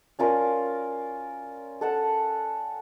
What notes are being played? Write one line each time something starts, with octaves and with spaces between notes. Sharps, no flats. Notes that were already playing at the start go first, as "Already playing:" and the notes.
C#4 F4 A#4 D5
A4 F#5 A5